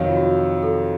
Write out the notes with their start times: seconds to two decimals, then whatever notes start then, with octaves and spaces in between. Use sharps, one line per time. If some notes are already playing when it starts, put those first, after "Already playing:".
Already playing: F2 C3 D#3 F#3 C#5 F5
0.09 F4
0.16 F#4
0.63 A4